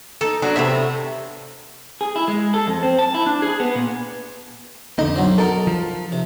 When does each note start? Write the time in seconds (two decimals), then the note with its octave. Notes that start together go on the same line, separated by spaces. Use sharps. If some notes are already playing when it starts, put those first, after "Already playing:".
0.21 D#4 A4
0.42 F#3 C#4 D4
0.56 A2 C3 A3 B3 E5
2.01 G#4
2.16 E4
2.28 G#3
2.54 A4
2.67 F2
2.83 C4
2.99 A5
3.15 E4
3.27 D4
3.42 G#4
3.60 B3
3.75 A#2
4.99 F2 D3 D#4 D#5
5.16 B1 F#3 C4
5.38 D#4 A4 A#4
5.67 F3
6.12 C3